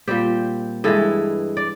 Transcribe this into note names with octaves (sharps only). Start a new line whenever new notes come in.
A#2 G3 C4 G4
G2 E3 G#3 A4
D5